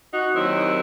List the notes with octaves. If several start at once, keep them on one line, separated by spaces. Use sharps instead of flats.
D#4 F#4
D#2 D#3 F#3 C4 E4